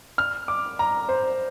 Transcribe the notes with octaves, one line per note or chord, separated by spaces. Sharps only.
F6
D6
A#5
C5